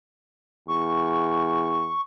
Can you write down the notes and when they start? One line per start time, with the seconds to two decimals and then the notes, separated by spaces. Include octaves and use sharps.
0.68 E2 C#6